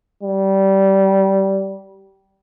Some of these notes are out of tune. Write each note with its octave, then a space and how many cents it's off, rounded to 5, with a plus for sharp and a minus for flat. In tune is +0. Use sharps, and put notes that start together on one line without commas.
G3 -20